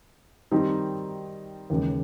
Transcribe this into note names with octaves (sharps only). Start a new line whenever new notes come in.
D#3 G3 C4 D#4
D#2 C#3 E3 G#3